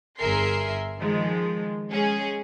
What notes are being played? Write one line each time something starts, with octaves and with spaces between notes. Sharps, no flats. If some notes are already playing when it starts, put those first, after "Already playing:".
G1 G#4 A#4 E5 C6 C7
D#3 F3 G#3
G#3 C#4 G#4